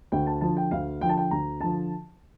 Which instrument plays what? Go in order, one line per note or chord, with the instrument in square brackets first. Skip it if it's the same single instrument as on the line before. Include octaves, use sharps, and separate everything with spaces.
[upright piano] D2 G5
A5
D3 F3 A5
G5
D2 F5
D3 F3 G5
A5
G5
D2 A#5
D3 F3 A5